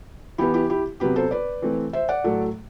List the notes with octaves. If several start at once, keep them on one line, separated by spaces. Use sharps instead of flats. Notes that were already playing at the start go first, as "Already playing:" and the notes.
E3 B3 E4 G4
E4 G4
E4 G4
C3 F#3 B3 G4 B4
A4 C5
B4 D5
E3 A3 C4
C5 E5
D5 F#5
A2 F#3 A3